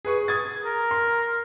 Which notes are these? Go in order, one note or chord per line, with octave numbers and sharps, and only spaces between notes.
G#4 B4 C#6
D#6 G#6 A6
A#4
C6